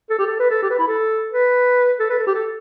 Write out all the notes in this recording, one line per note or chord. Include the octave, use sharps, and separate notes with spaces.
A4
G4
A4
B4
A4
G4
B4
E4
A4
B4
A4
B4
A4
G4
A4